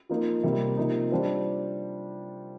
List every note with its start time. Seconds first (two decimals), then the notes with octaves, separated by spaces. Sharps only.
0.09 F3 A#3 D#4
0.43 C3 G3 A#3
0.77 C3 F3 A#3 D#4
1.11 G3 D4 F4 C5